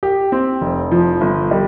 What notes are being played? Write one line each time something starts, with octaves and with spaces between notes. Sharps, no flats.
G4
C4
F1
F3
G1
G3